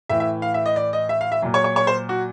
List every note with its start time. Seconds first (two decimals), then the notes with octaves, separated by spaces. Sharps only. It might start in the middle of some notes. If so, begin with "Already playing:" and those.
0.09 A2 E3 E5
0.20 E5
0.42 F5
0.54 E5
0.66 D#5
0.76 D5
0.93 D#5
1.09 E5
1.21 F5
1.32 E5
1.42 A#2 F#3
1.54 C#5
1.64 C#5
1.76 C#5
1.87 C5
2.09 F#4